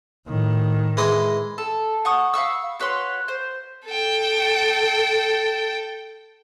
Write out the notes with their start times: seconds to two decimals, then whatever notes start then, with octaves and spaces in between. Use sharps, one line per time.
0.27 A2 D#3
0.97 E3 G#3 D#5
1.58 A4
2.05 F#5 C#6 D#6
2.34 F5 B5 C#6 E6
2.80 F#4 B4 C#5 C6
3.28 C5
3.85 A4 G5